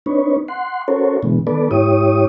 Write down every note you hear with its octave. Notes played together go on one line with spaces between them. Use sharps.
C4 D4 D#4 B4 C#5
F#5 C6
C#4 F#4 A4 A#4 C5 C#5
B2 D3 E3 G#3 B3
D#3 B3 A4 B4 D5
G#2 E4 G4 C#5 D#6